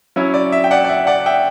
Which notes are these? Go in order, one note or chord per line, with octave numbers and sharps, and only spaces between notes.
F#3 C#4 E4
D5
E5
G5
D5 F#5
D5
E5
D5 F#5
E5 G5